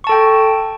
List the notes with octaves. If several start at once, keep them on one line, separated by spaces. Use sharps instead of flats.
A4 G5 A5 C#6